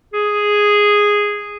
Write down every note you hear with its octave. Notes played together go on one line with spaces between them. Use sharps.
G#4